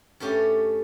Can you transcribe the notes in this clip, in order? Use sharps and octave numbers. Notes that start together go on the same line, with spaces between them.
G2 A3 C#4 G4